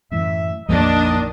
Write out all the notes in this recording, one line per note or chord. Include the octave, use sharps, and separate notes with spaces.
F#2 A2 E3 E5
A#1 F2 D#3 F3 F#3 A#3 D4 D#5